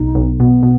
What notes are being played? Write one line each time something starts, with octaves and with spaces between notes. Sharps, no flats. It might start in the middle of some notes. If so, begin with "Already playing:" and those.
Already playing: B1 D#4
B1
B2 B3
B2